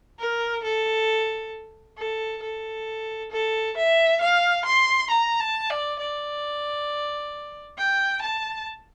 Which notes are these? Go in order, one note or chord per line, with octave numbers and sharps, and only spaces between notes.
A#4
A4
A4
A4
A4
E5
F5
C6
A#5
A5
D5
D5
G5
A5